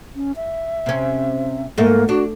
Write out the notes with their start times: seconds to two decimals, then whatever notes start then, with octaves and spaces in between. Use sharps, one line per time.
0.16 C#4
0.36 E5
0.86 C3 C#4
1.78 G#2 A3 A#3
2.09 D4 F#4